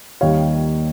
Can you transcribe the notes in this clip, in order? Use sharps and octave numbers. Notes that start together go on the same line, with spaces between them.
D#2 D#3 G3 C#5 F5